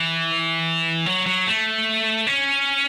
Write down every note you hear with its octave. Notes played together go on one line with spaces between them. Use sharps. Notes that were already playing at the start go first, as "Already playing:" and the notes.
Already playing: E3
F#3
F#3
A3
C#4